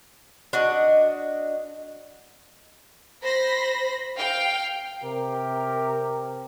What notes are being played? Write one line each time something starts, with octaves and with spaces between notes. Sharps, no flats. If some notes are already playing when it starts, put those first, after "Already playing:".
D4 F#4 D#5
C5 B5 A#6
F5 G5
C3 G4 A#4